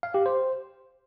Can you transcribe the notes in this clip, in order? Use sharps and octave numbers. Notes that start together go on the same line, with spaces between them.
F5
G4
C5